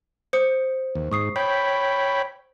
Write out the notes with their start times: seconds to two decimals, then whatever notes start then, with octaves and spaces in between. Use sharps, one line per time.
0.33 C5 D#6 C#7
0.95 D#2
1.11 G#2 C#6 D#6 C7
1.36 C#5 G5 B5 G6 B6